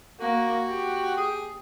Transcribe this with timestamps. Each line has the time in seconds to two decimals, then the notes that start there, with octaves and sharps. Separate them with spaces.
0.20 A#3 F#4
0.69 G4
1.17 G#4